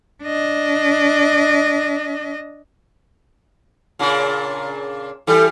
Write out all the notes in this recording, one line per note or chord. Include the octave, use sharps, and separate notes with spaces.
D4 D#5
A#2 C#3 D4
E3 G3 A4